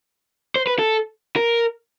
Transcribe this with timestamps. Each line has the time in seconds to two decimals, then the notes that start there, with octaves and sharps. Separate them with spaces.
0.56 C5
0.67 B4
0.79 A4
1.36 A#4